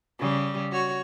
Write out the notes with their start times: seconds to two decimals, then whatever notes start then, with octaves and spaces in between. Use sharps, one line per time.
0.19 C#3 G3
0.71 F#4 C#5